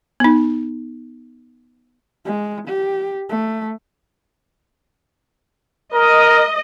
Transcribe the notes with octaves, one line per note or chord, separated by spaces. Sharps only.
B3 D#4
G#3
G4
A3
A#4 D#5